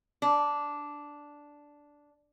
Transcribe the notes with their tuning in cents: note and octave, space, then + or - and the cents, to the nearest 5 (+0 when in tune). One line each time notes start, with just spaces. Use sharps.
D4 -5